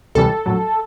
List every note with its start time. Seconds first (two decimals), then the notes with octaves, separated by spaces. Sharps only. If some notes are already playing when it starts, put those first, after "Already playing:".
0.15 D2 C3 E3 G3 A4
0.46 A#1 A2 F#3